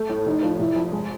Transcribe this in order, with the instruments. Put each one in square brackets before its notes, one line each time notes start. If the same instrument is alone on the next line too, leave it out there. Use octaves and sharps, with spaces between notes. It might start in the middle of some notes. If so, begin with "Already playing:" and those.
Already playing: [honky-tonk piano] A3
A2
[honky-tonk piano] F1 [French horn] D#4
[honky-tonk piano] F3
[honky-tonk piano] F1 [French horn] E4
[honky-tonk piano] F2
G#3